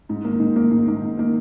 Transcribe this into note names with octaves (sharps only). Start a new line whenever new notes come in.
G#2
D#3 A#3
G#2
D#3 A#3
G#2
D#3 A#3
G#2
D#3 A#3